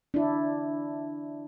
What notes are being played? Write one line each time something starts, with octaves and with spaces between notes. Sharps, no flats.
D4 E4